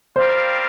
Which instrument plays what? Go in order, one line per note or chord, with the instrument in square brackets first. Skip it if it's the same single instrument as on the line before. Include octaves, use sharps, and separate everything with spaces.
[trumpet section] G3 C4 F4 A#4 F5 [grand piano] C5